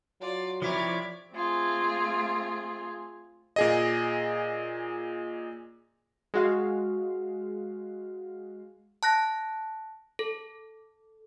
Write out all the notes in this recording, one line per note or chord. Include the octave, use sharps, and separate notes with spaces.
F#3 F4 D5
C3 F3 G3 E4 A#4 C#5 D5 D6
A3 C4 F4 G#4
A#2 G#4 D#5
G#3 F#4 F5
A5 F#6 A#6
A4